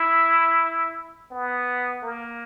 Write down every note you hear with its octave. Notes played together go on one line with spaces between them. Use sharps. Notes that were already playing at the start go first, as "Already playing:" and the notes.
Already playing: E4
B3
A#3